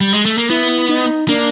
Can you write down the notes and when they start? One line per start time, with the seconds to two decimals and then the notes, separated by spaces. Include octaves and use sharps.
0.01 G3
0.13 G#3
0.25 A3
0.38 A#3
0.50 B3 E4
0.89 D#4
1.28 A#3 D4